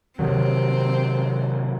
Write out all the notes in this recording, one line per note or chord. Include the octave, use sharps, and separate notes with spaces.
C3 D#3 F#3 C4